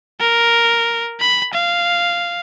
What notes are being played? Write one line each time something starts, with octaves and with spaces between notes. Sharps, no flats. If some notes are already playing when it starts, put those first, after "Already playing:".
A#4
B5
F5